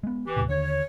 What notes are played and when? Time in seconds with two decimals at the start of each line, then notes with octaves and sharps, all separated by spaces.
0.03 G#3 B3
0.25 E3 G4
0.37 D#2 A2 C3
0.49 D#2 D3 C#5